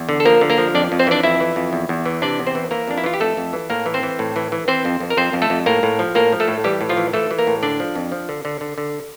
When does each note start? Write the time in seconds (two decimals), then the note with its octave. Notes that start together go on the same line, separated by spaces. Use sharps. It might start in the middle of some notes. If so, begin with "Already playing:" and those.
Already playing: E2
0.09 D3
0.20 A4
0.25 F3 A#3 A#4
0.41 D3
0.50 A#3 A#4
0.58 F3
0.74 F2 D4 D5
0.92 F2
0.99 C4 C5
1.07 E3 D4 D5
1.23 F2 E4 E5
1.40 E3
1.56 F2
1.73 E2
1.89 E2
2.06 E3
2.22 C3 D4 D5
2.39 E2
2.47 C4 C5
2.55 E3
2.71 E3 A#3 A#4
2.88 F2 D4
2.98 E4
3.04 E3 F4
3.14 G4
3.20 F2 A3 A4
3.37 F2
3.53 E3
3.70 A2 A#3 A#4
3.86 E3
3.94 C4 C5
4.03 E3
4.19 A2
4.36 E3
4.52 E3
4.68 E3 C4 C5
4.85 F2
5.00 F2
5.10 A#4
5.17 F2 C4 C5
5.33 F2
5.42 A3 A4
5.50 F2
5.66 A2 A#3 A#4
5.83 A2
5.99 F3
6.15 A2 A#3 A#4
6.32 F3
6.40 A3 A4
6.48 A2
6.64 E3 G3 G4
6.81 A2
6.89 F3 F4
6.97 E3
7.13 E3 A3 A4
7.31 E3
7.39 A#3 A#4
7.47 A2
7.63 D3 D4 D5
7.80 F3
7.95 F2
8.12 F3
8.29 D3
8.45 D3
8.61 D3
8.78 D3